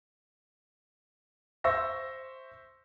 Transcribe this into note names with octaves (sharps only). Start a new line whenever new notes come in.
C5 E5 C#6 E6 A#6